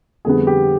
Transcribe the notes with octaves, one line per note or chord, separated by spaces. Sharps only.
F2 D3 G3 B3 G#4
G4